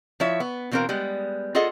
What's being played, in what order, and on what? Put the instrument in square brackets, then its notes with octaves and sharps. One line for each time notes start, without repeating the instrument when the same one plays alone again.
[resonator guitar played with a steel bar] F3 E4 C#5 E5
B3
B2 E3 C4 D#4 A#4 F5
G3 G#3 B3
F4 G#4 A4 D#5 F#5